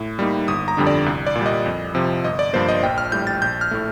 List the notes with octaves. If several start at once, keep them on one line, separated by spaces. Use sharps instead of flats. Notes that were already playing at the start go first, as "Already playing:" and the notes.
Already playing: A2
G3 A#3 D#4
G1 D#6
A#5
F2 D3 G3 D4
D5
C2
D5
A#2
G3 D#5
F2
C3 F3
G1 D#5
D5
G2 F3 A#3 C5
D#5
A#1 G5
F6
A2 G3 G6
A6
A#1 G6
F6
A2 A3